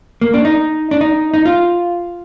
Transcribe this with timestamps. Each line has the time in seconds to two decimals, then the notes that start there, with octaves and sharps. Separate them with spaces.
0.21 A#3
0.34 D4
0.45 D#4
0.91 D4
1.01 D#4
1.34 D#4
1.45 F4